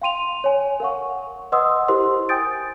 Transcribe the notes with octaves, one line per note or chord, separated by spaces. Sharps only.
F5 G5 C6 D#7 F7
C#5 G#5
A#4 F5 F#5 C#6
B4 D#5 F#5 C6 D#6 E6
E4 G4 A#4 C5 C6
G5 G#5 D#6 G6 A6 D7